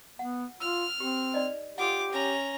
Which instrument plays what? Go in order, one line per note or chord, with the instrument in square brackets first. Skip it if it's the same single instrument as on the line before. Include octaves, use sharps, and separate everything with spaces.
[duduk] B3 [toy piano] F#5
[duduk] F4 [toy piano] E6 [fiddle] F6
[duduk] C4 [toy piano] G4
[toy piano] D#4 D5 D#5
[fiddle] F4 D6 [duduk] G4 [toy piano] A4 F#5
[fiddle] C#4 A#5